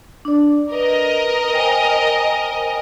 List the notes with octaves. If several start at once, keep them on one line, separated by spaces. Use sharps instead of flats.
D4 D5
A#4 B4 D#5
C5 G5 G#5